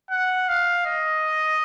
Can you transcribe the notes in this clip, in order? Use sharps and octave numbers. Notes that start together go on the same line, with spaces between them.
F#5
F5
D#5